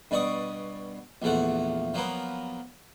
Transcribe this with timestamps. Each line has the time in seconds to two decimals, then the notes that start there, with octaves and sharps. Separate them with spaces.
0.11 G2 B2 D5 C#6 D#6
1.22 A#1 E2 F3 A3 F#5
1.94 F3 F#3 A#3 B3